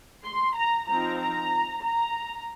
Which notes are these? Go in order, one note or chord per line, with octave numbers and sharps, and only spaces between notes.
C6
A#5
F3 C4 D#4 A#5
A#5
A#5